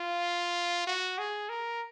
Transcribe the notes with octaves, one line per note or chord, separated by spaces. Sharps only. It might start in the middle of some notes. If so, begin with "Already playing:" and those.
Already playing: F4
F#4
G#4
A#4